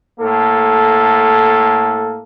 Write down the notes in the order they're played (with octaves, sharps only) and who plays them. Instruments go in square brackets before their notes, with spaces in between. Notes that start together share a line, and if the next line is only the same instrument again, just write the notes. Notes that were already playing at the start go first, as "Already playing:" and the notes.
[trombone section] A2 A#3 A4